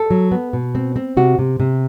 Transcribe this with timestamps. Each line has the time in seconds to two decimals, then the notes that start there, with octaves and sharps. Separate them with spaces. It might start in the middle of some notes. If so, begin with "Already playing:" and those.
Already playing: A4
0.10 F#3
0.31 B3
0.53 B2
0.75 C4
0.96 C4
1.17 C3 F#4
1.39 C3
1.60 C3